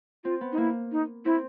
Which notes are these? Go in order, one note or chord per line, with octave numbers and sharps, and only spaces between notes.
C4 F4
B3
D#4
A#3 E4
D#4
C4 E4